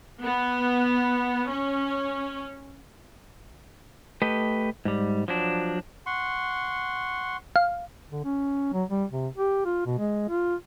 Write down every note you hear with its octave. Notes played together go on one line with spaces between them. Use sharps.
B3
C#4
A3 G4 B4 D#5
G#2 G3
F3 F#3 D4
F#5 C6 C#6
F5
D3
C#4
F#3
G3
C3
G4
F4
B2
G#3
F4